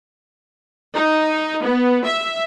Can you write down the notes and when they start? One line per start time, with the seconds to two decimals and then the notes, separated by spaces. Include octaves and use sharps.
0.94 D#4
1.63 B3
2.05 E5